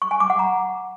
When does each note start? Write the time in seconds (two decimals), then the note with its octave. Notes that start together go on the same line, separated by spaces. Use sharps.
0.02 C#6
0.11 G#5
0.20 D6
0.30 F#5
0.39 A#5